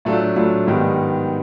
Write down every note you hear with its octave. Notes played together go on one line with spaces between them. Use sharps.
A2 F#3 A3 D4 F4
A2 F#3 A3 D4 F4
G#2 D#3 G3 B3